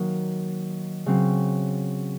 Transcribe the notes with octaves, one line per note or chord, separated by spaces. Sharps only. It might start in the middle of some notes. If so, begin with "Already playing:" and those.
Already playing: D#3 F#3 A#3 D#4
C#3 F#3 C4